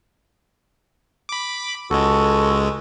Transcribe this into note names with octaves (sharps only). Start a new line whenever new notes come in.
B5 D6
C#2 G#3 F#4 A4